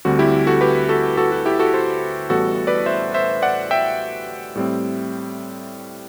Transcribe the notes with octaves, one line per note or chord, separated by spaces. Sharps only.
D2 D3 G3 C4 F#4
E4 G4
F#4 A4
G4 B4
F#4 A4
F#4 A4
F#4
E4 G4
F#4 A4
A4 C5
A1 A2 E3 G3 B3 F#4 A4
B4 D5
C5 E5
C5 E5
D5 F#5
E5 G5
A2 G3 C4